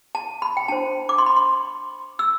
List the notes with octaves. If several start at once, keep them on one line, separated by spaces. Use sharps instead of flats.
A5
B5
G5
D4 F#4 C5 A5
D6
C6
B5
C6
E6